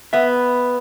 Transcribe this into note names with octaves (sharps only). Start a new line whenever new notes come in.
B3 E5